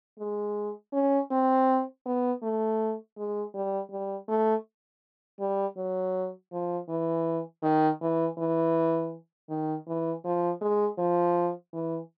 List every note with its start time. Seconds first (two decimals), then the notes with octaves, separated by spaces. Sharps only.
0.19 G#3
0.93 C#4
1.31 C4
2.06 B3
2.43 A3
3.17 G#3
3.54 G3
3.91 G3
4.28 A3
5.40 G3
5.77 F#3
6.52 F3
6.89 E3
7.63 D#3
8.01 E3
8.38 E3
9.49 D#3
9.87 E3
10.24 F3
10.61 G#3
10.98 F3
11.73 E3